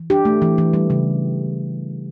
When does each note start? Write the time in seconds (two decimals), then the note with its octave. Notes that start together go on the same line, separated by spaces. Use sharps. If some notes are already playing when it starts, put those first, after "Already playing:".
Already playing: E3
0.10 D4 G4
0.25 A3
0.42 E3
0.58 E3
0.73 G3
0.90 C#3